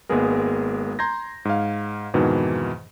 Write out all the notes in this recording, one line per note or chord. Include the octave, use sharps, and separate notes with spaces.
G#1 G#3 A#3 B3 G#4 A#4
A#5 C6 G6 G#6 A#6
G#2 F5
F2 G#2 B2 D#3 E3